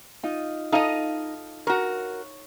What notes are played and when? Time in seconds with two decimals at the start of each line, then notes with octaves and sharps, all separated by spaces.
0.23 D#4 F4 D#5
0.72 D#4 A4 D#5 F5 D#6
1.67 F#4 A#4 C#5